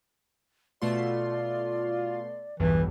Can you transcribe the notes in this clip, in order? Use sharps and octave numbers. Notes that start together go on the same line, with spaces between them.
B2 A3 F4 D5 C6
B1 E2 G2 E3